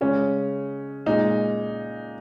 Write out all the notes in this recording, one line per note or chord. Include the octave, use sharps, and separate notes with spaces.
C#3 G#3 C#4
A#2 G#3 D#4